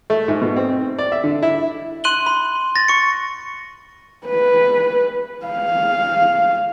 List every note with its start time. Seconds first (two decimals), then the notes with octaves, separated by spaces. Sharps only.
0.10 A3
0.28 G#2
0.42 B2
0.56 C4
0.98 D5
1.12 E5
1.24 D3
1.42 E4
2.04 C6 F#6 D#7 F#7 G7
2.26 B5
2.75 A6 A#6
2.88 C#6 C#7
4.27 B4
5.46 F5